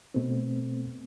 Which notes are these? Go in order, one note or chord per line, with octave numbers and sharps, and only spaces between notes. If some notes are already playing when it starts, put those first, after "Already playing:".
B2 A3 B3 C4